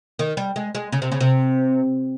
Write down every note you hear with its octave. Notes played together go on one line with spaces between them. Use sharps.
D#3
G3
G#3
G#3
C#3
C3
C#3
C3